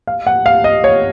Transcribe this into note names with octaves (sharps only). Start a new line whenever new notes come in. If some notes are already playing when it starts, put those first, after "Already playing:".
F5
F#5
F5
D#5
C#5